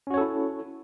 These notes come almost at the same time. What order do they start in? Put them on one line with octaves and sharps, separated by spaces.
C#4 F#4 C#5 A4 E4